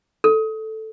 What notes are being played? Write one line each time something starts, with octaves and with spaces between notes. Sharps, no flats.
A4